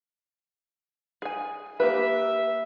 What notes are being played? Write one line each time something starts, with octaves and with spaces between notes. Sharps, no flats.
G#4 G#5
A#3 G4 B4 E5